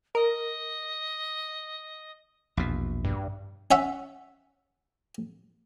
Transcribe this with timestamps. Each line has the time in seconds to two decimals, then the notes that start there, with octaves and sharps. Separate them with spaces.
0.15 A#4 D#5
2.57 A#1 E2 B2
3.05 G2
3.71 C#4 E5 F#5